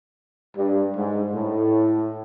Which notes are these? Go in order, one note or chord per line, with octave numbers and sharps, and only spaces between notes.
G2
G#2
A2